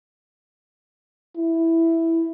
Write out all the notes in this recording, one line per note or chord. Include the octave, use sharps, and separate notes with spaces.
E4